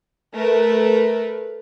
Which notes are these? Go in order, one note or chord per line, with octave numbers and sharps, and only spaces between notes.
A3 A#4 B4